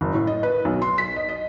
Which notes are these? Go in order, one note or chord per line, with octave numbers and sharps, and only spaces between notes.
F#1
A2
D#5
B4
B1
C6
B6
D#5
D#5